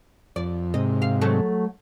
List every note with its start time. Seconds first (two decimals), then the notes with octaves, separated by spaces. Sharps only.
0.36 F2 D5
0.74 G#2 C3 D#5
1.02 F5
1.22 F#3 A3